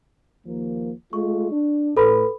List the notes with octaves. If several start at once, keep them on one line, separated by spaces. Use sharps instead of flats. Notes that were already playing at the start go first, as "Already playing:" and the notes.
D#2 F3 A#3
G#3 A3 F4 C#6
D4
A2 A4 B4 B5